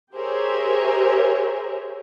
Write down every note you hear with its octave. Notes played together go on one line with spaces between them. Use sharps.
G4 G#4 A#4 C5 C#5 E5